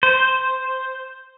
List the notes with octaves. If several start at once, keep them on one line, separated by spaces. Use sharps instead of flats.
C5